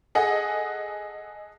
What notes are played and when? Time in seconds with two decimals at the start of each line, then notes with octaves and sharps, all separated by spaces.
0.15 G#4 A4 D#5 F#5